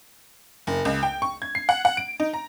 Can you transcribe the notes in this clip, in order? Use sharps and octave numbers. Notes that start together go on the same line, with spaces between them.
F#1
C#2
G5
C#6
G#6
C7
F#5
F#5
D7
D#4
A#5